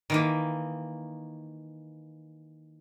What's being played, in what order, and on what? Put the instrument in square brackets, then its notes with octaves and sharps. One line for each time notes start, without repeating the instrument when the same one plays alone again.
[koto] D#3 E3 A#3